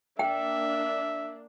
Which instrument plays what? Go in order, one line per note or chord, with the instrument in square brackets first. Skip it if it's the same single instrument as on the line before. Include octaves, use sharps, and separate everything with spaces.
[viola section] A#3 D4 [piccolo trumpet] E5 [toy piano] G5